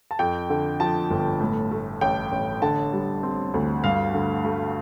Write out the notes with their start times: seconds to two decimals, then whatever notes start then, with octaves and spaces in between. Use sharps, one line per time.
0.11 A5
0.19 F2 G5
0.50 D3
0.80 F3 A5
1.11 G1
1.41 A2
1.71 A3
2.01 A1 G5
2.32 A1
2.62 D3 A5
2.93 G3
3.23 C4
3.54 D2
3.84 G2 F5
4.14 D3
4.45 A3